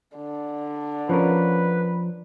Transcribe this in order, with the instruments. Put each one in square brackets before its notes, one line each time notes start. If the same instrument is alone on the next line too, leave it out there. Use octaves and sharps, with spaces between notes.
[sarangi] D3
[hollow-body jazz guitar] F3 C#4 A#4 [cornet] B4